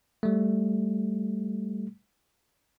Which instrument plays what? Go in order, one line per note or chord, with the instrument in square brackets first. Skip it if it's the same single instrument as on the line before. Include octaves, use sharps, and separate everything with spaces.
[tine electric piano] G3 A3